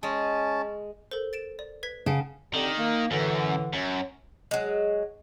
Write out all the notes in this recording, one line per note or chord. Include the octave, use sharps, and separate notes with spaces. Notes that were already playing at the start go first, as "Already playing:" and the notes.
G#3 C#4 A5
A4 A#4 C5
A6 D7 E7
D5
B4 G#6 B6
C#3 F#5 G5 A5
D3 D#3 C4 G4
A#3
F#2 A2 D3 E3
F#2
F#3 G#3